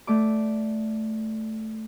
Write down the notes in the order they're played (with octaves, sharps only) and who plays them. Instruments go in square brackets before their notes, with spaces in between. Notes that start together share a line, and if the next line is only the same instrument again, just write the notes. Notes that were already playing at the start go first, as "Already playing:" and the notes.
[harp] A3 D5 D6